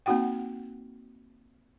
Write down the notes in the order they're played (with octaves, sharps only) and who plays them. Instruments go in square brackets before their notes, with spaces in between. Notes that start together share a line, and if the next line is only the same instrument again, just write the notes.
[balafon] A#3 C4 D#4 F#4 F#5 G5